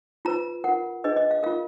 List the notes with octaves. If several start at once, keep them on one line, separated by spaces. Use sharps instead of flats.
F4 B4 A#5
F4 A#4 F#5
D4 G#4 B4 D#5
D#5
F5
F4 A#4 F5